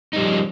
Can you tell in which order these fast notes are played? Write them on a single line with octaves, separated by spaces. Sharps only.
D#4 G3 F3 C#4